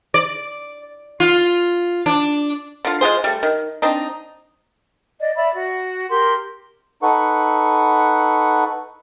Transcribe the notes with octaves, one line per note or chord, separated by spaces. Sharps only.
D5
F4
D4
D3 F4
G#3 F4 G#4 C5
G3 A3
D#3
C4 D4 D#4
D5 D#5
D5 E5 B5
F#4
G4 A#4 C6
D#4 A4 B4 F#5 C#6